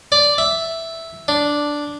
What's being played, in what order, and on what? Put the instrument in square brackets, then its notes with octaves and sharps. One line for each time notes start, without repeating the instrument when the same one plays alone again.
[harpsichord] D5
E5
D4